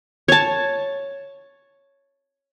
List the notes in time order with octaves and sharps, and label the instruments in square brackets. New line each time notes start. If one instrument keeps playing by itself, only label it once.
[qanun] C#5 A5